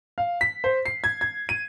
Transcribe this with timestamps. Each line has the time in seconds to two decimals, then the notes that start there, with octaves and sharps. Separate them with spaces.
0.18 F5
0.41 B6
0.64 C5
0.86 C7
1.04 G#6
1.21 G#6
1.49 D#7